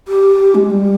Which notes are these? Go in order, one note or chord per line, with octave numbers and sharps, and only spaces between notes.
G4
G#3
G3